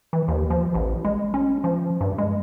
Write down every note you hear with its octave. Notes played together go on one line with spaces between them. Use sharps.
E3
D#2
F3
A1
G#3
C#4
F3
G2
G#3